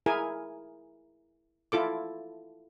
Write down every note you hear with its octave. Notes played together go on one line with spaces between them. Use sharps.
E4 G#4 A#4 G#5
E4 F4 A4 D6